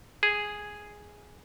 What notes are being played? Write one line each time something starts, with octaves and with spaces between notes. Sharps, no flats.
G#4